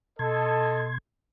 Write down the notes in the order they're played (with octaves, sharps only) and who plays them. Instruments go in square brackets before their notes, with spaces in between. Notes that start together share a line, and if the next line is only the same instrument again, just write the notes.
[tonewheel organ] B2 C6 G#6 [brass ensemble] A4 D#5